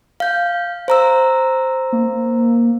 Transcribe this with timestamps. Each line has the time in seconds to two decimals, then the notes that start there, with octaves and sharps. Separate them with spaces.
0.20 F5 G6
0.88 C5 A#5 E6
1.92 A#3